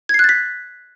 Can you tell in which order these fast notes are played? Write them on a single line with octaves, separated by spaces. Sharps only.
G#6 C7 F#6 A6 B6